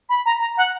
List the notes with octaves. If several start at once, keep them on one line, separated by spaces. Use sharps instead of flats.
B5
A#5
A#5
F#5